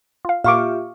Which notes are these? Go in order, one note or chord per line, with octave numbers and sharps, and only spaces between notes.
F4 F5
A#2 A#3 F4 G4 E5 F5 C#6 D6